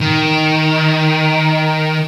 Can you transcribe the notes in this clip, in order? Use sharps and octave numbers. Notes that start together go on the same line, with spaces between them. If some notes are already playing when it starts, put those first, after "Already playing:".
D#3